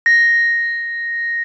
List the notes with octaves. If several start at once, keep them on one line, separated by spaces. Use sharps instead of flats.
A#6